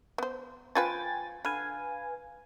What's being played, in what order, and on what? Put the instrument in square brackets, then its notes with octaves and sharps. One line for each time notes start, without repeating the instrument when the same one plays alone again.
[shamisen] B3 C5
[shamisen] F3 F4 B4 [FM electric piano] G5 G#5 A6
[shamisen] D3 [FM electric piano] B4 F5 G#5